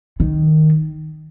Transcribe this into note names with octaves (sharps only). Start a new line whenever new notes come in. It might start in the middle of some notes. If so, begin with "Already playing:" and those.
D#3